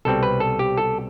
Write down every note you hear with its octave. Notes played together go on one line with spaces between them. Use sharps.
C2 B2 G3 C4 A4
B4
A4
G4
A4